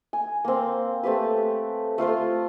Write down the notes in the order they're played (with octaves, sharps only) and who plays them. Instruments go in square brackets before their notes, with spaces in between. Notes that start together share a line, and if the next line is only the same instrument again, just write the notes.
[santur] G#5
A#3 C4
A3 C4 G4 B4
A3 F4 C5 F5